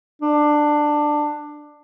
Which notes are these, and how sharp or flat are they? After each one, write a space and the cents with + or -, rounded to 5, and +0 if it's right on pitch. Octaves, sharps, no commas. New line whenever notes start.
D4 +15